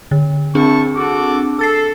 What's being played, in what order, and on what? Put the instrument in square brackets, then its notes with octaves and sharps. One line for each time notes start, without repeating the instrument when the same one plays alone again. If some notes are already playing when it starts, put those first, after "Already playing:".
[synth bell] D3
[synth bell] C4 D4 G#4 [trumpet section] E4 A5 C#6
[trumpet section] F#4 A4 D6
[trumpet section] A4 [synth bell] E6 A6 C7